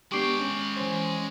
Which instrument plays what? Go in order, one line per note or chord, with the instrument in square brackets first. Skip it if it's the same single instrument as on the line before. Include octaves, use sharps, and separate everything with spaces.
[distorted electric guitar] G#3 G5 [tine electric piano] B3 D4 G4 [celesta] C#6 D6 C7
[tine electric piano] C#4
E3 C#4 C5